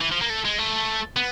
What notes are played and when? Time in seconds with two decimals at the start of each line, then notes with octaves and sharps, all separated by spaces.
0.01 E3
0.12 F3
0.21 A#3
0.30 A3
0.45 G#3
0.58 A3
1.16 B3